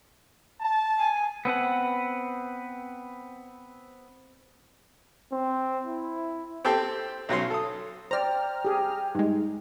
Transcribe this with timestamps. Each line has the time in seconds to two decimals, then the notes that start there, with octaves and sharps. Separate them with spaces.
0.60 A5
0.99 G#5
1.45 B3 C4 B4 F#5
5.32 C4
5.85 E4
6.65 C4 G4 A4 G5 C6
7.29 B1 F#3 C#4 C6
7.50 A4 D#6
8.11 C5 D5 G5 A#5 F6
8.65 G4 G#4
9.15 G2 G#3 D#4